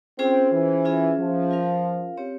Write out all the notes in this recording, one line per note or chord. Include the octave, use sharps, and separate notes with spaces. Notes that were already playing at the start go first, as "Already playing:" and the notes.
C4 C#4 F4 G#4 C5
E3
C#4 F4 G#4 E5
F3
F4 A#4 F5
C4 G4 C#5